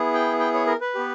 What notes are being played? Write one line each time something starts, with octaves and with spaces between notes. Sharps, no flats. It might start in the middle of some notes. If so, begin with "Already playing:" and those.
Already playing: B3 E4 G#4
G5
G5
C#5
A#4
B4
B3 G4